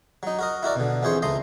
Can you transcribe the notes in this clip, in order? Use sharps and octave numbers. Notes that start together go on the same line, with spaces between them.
F#3 D#4
F#4 A#4 D#5
E4 F#4 A#4 D5
B2 D3
F2 E3 G#4 C5 C#5
C#2 A3 A#5 C6 D#6